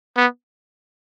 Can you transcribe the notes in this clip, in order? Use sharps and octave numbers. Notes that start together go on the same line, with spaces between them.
B3